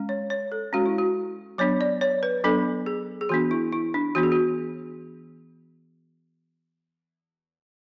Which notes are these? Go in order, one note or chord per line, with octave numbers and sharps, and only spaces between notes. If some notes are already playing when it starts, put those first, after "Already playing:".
Already playing: G#3 C#4
C#5
C#5
A4
G#3 C#4 F#4
E4
F#4
F#3 B3 D4 C#5
D5
C#5
B4
F#3 B3 D4 A4
G#4
G#4
E3 B3 D4 F#4
E4
E4
D4
E3 B3 D4 F#4
G#4
F#4